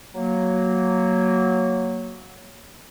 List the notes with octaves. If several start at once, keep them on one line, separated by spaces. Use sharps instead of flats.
F#3 A#3